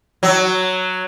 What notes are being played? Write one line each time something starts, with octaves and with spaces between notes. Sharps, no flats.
F#3